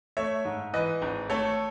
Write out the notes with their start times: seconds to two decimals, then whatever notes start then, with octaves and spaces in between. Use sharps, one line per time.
0.17 A3 C#5 E5
0.45 G#2
0.74 E3 B4 D#5
1.02 G#1
1.29 A3 A4 C#5